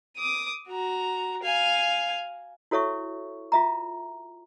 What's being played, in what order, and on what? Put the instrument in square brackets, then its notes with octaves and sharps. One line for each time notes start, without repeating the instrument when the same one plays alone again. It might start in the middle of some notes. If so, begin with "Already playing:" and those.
[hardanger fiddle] D6 D#6
F#4 A#5
F5 G#5
[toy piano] E4 F#4 A4 C#5 E5 C#6
F4 E5 A#5